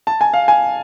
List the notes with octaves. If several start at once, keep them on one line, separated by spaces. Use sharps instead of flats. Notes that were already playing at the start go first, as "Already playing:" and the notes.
A5
G#5
F5
G#5